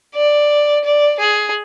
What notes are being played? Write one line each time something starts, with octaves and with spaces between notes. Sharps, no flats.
D5
D5
G#4